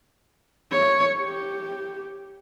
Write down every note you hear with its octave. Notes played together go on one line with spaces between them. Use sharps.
C#5
G4